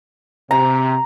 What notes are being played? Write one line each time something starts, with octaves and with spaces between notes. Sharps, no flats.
C3 A#5